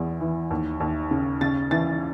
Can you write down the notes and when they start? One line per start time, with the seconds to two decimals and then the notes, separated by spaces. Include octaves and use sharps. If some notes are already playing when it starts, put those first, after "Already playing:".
Already playing: E2 E3
0.21 E3
0.51 D#2
0.80 D#2
1.11 C#3
1.41 C#3 A6
1.71 E3 A6